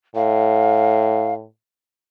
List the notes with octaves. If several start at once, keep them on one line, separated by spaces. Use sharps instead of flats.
A2 F5